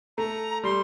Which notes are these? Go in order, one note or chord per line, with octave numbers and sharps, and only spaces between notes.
A3 A#5
G3 C6